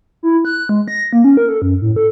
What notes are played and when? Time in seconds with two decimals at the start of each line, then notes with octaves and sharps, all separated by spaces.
0.23 E4
0.45 F#6
0.69 G#3
0.88 A#6
1.13 A#3
1.24 C#4
1.37 A#4
1.49 A4
1.62 F#2
1.82 A2
1.96 A4